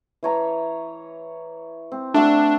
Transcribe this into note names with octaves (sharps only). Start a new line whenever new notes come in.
E3 C#5 A#5
C4
A3 D4 F#4